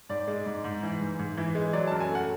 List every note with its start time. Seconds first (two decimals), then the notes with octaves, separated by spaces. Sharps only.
0.09 G#2 D5
0.27 G#3
0.46 G#2
0.64 G#2
0.83 E3
1.01 G#2
1.19 G#2
1.37 E3
1.55 G#3
1.73 F#3 D5
1.87 F#2 A5
2.00 G#5
2.09 A3
2.15 F#5